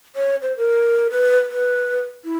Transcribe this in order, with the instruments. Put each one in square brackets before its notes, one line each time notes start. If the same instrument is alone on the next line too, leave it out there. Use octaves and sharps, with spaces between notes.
[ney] C#5
C5
A#4
B4
B4
E4